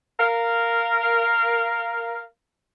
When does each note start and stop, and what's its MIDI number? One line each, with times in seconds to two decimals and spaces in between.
0.20 2.23 70
0.20 2.23 77